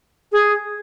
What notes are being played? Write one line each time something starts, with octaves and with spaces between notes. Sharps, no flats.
G#4